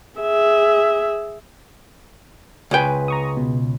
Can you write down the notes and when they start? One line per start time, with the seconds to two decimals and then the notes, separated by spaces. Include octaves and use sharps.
0.20 G#4 E5
2.71 C#2 G#4 B4 G5 G#5
3.08 A#5 C#6 D#6
3.37 B2